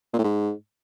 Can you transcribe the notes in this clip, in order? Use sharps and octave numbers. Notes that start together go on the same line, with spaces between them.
A#2
A2
G#2